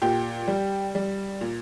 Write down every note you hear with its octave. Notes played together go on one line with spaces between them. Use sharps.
A#2 G4
G3
G3
A#2